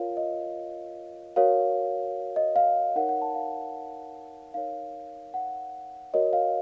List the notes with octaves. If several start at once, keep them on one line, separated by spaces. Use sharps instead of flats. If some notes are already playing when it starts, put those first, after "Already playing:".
Already playing: F4 A#4 C#5 F5
D#5
F#4 A#4 C#5 F5
D#5
F5
D#4 A#4 C#5 F#5
F#5
A5
F5
D#4 A#4 C#5 F5
F#5
F#4 A#4 C#5 D#5
F5